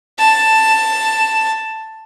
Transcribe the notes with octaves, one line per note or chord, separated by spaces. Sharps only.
A5